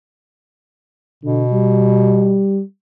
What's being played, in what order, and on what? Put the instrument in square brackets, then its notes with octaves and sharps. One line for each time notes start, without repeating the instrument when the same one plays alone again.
[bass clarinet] B2 [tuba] D3
[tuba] G3